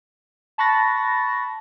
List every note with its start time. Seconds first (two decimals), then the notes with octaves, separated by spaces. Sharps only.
0.58 A5 B5 C#6 F#6 A6 A#6